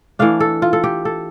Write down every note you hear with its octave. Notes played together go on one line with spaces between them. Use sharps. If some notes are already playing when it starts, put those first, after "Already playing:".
E3 A3 D4 F5
A4
F4
A4
G4
A4